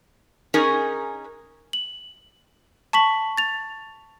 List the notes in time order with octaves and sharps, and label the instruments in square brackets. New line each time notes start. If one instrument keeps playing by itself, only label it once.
[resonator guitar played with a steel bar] C#4 D#4 G#4 A#4
[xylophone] F#7
A5 C#6 B6 F#7
A6 F7